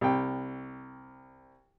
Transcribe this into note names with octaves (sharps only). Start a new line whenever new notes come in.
C2 G5